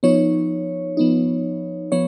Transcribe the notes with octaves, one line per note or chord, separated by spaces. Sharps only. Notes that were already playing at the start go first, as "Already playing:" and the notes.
F3 B3 D#4 C#5
F3 B3 D#4
F3 B3 C#5